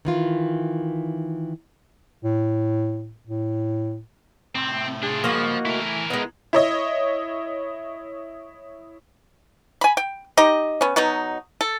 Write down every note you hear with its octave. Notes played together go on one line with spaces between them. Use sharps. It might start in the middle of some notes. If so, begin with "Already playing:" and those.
D#3 E3 F4
A2
A2
A2 C3 C4
D4 F4 G#4
C#2 G2 F3 A#3 D#4 F#4
E3 A3 E4 A#4
G#3 B3 D#4
E4 C#5 D#5
G#5 B5
G5
D#4 G4 D#5
B3 C#4
B2 F#3 B3 D#4
A4